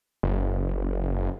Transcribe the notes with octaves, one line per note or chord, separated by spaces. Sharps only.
F#1